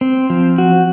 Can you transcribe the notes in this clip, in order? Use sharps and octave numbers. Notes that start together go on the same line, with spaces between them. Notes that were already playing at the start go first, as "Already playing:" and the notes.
C4
F3
F#4